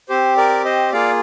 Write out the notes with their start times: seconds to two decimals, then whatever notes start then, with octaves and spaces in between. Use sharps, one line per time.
0.09 C4 G4 C5
0.37 A#4 D5
0.65 C5 D#5
0.92 A#3 F4 G#4 D5 F5